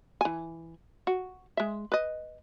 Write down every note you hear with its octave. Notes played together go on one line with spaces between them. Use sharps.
E3 G#5
F#4
G#3 E5
B4 D#5